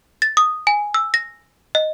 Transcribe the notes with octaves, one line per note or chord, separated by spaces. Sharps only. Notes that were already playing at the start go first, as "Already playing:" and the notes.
A6
D#6
G#5
E6
A#6
D#5